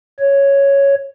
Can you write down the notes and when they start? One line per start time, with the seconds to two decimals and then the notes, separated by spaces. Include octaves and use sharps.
0.20 C#5